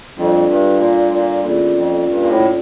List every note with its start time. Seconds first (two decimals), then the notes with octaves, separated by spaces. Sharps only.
0.16 F2 G3 D4 F4 A4 D5
0.48 G2
0.80 A#2
1.12 A#2
1.44 E2 A#3 C#4 F4 A4 D5
1.75 F2
2.08 G2
2.21 A#2
2.29 A2